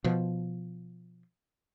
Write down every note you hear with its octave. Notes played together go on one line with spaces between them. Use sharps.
B2 F3